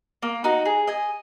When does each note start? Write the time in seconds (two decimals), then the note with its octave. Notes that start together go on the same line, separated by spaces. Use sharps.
0.22 A#3
0.44 D#4 F#4
0.65 G#4
0.87 D#5 G#5